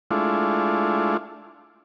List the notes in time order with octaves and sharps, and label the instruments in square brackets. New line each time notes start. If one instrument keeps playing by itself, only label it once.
[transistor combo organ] G#3 A3 D4 E4 F4